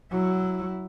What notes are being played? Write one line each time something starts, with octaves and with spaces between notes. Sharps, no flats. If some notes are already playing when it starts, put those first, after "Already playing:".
F#3 E4